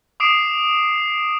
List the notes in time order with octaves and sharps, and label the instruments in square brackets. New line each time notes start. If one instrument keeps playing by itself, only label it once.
[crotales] D6 D#6 C7 D7 E7